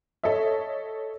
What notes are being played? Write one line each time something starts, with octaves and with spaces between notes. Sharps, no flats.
A4 C#5 D#5 E5